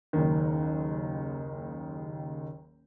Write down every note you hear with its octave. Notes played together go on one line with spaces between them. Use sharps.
F#1 D#2 D#3